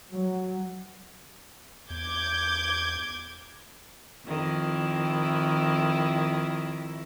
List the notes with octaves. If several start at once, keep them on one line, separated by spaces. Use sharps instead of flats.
F#3
E2 D6 G6 G#6
F2 D#3 E4